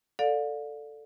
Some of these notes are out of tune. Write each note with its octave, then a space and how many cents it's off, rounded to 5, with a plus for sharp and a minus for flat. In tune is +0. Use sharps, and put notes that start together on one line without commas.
A4 +10 D5 +0 F5 +35